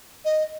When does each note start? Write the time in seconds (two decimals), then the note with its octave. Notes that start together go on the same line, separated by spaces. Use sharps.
0.25 D#5